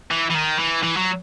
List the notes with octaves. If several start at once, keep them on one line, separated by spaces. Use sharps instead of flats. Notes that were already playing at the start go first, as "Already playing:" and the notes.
E3
E3
D#3
E3
E3
F#3